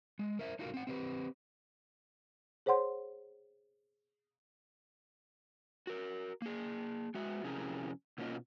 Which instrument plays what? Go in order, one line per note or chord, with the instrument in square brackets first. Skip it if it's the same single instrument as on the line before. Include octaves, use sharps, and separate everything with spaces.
[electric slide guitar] G#3
A#4 C5 E5
D4 D#4 F4 F#4 G#4 A#4
C4 F#5
C4 G4 B4
[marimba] G#4 C5 C#5 F#5 C6
[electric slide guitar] F#4 A#4
A#3 G#4
G#3 F#4 E5
F2 C3 C#4 E4 G#4 A#4
B2 A#3 C#4 F4 D#5